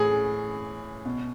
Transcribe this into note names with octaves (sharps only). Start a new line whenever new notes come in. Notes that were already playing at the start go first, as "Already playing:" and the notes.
Already playing: A2 E3 G#4
B2